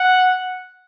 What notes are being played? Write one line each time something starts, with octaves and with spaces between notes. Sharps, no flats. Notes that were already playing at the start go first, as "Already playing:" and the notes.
Already playing: F#5